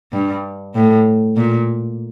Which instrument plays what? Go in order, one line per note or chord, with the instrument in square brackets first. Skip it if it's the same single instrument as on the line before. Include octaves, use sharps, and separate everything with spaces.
[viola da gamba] G2
A2
A#2